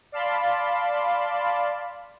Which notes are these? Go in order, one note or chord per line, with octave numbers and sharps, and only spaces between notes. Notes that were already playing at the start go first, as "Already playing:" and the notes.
D5 F5 A5 B5 C6